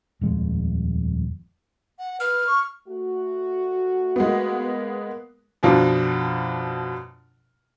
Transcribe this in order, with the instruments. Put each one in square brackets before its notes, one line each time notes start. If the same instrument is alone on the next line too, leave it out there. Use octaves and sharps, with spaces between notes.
[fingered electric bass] D#1 F2 G#3
[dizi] F#5
[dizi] B4 [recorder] F6
[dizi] C#6
[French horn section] A3 F#4
[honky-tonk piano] G#3 A#3 B3
[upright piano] F#2 B2 F3 D4 F4